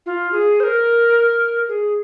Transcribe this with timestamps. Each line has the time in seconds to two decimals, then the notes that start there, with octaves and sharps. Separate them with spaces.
0.06 F4
0.32 G#4
0.60 C5
0.64 A#4
1.69 G#4